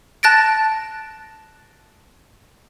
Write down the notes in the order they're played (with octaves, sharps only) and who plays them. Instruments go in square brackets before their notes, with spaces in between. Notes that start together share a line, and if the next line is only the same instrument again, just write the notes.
[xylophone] A5 F#6 A6 A#6 D7